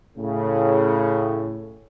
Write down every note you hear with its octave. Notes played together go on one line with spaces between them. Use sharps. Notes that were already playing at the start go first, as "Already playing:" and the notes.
A2 C#3